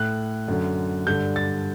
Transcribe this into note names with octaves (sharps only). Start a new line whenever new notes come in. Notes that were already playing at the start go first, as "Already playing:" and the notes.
Already playing: A2 F#6
F#2 D3
G2 D3 G6
A6